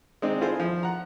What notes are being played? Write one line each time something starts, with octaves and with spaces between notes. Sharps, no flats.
G#3 C4 D4 D#4
E4 F4 G#4 A4 C5
F3
F#5 A#5